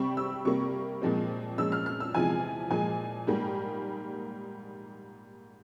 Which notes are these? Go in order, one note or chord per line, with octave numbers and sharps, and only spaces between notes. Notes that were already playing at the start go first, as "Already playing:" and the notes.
Already playing: C3 G3 C4 C#6
E6
C3 G3 A#3 C#6
A#2 F3 G#3 C4
A#2 F3 G#3 C#4 E6
F6
F6
E6
E2 C3 F3 G#3 G#5
A#2 F3 G#3 G#5
G#2 G3 A#3